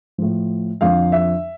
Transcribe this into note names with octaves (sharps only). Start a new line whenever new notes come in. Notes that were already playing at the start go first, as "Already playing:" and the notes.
A2 F3
F2 D3 F3 F5
E5